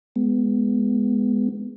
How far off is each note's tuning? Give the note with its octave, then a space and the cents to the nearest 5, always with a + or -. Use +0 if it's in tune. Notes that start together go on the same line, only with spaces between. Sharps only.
G#3 +0 B3 +0